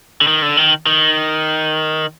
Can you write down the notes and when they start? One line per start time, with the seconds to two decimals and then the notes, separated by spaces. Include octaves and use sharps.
0.21 D3
0.27 D#3
0.42 D3
0.57 D#3
0.87 D#3